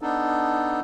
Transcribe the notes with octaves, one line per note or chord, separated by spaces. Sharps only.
B3 D4 D#4 A4